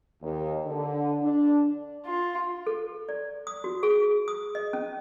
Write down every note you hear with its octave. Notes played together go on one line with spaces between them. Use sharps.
D#2
D3
D4
F4
A4
D5
D#6
F#4
G#4
D#6
D#5
C#4